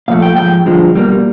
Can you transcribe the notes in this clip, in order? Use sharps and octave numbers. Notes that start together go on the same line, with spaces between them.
A#2 F3 A3 F5
G5
G#2 F3 G#3 G5
G2 D3 F3 G#3
B2 G3 A#3